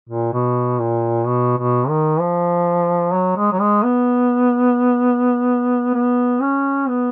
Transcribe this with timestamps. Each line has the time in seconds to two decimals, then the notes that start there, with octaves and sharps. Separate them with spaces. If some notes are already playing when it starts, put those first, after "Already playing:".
0.09 A#2
0.33 B2
0.79 A#2
1.27 B2
1.58 B2
1.89 D#3
2.20 F3
3.14 F#3
3.37 G#3
3.53 F#3
3.61 G#3
3.83 B3
5.94 B3
6.42 C#4
6.88 B3